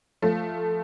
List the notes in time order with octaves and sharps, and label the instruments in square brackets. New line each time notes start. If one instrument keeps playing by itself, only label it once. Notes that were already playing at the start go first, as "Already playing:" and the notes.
[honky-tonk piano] F3 A3